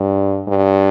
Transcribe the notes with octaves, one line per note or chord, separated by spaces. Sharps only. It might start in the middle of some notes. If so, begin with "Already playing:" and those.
Already playing: G2
G2